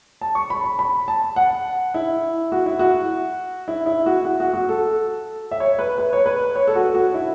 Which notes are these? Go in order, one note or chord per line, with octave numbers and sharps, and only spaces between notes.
A5
C#6
B5
B5
B5
A5
F#5
E4
F#4
E4
F#4
E4
E4
F#4
F#4
F#4
F#4
A4
E5
C#5
B4
B4
C#5
B4
C#5
A4
F#4
F#4
E4